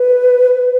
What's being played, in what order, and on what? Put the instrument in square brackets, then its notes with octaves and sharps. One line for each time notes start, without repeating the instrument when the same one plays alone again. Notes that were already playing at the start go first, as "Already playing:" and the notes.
Already playing: [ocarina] B4